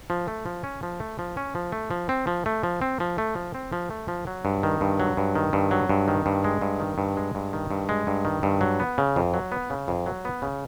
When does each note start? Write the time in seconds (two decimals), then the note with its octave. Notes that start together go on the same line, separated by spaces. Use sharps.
0.10 F3
0.28 A3
0.46 F3
0.64 C#4
0.83 F3
1.00 A3
1.19 F3
1.37 C#4
1.55 F3
1.72 A3
1.91 F3
2.09 C4
2.27 F3
2.46 A3
2.63 F3
2.82 C4
3.00 F3
3.18 A3
3.35 F3
3.55 C4
3.73 F3
3.90 A3
4.08 F3
4.27 F#3
4.45 G2
4.63 D#3
4.81 G2
5.00 F#3
5.17 G2
5.35 D#3
5.53 G2
5.71 F#3
5.89 G2
6.08 D#3
6.26 G2
6.44 G#3
6.61 G2
6.80 D#3
6.98 G2
7.17 G#3
7.35 G2
7.53 D#3
7.71 G2
7.89 G#3
8.07 G2
8.25 D#3
8.43 G2
8.61 F#3
8.80 B3
8.98 C#3
9.16 F2
9.34 F#3
9.52 B3
9.70 C#3
9.88 F2
10.06 F#3
10.25 B3
10.42 C#3